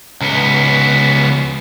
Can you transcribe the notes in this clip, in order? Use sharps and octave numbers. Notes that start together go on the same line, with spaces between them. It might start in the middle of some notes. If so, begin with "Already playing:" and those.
C#2 B3